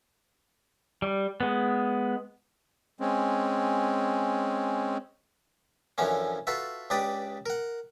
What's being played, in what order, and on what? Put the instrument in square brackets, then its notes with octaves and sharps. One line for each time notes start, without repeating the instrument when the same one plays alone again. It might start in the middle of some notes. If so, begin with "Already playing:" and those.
[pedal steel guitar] G3
G#3 B3
[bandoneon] G#3 C4 C#4
[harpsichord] F#2 D3 E3 F3 C#4
F4 F#4 A4 B4 E5
C#2 D4 G4 B4 D5 D#6
A#4 F#5